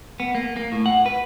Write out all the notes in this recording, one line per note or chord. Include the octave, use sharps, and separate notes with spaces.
B3
A#3
A#3
A2
F#5
B4